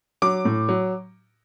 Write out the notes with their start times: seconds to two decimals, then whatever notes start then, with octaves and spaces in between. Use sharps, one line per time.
0.22 F#3 D6
0.45 A2
0.69 F#3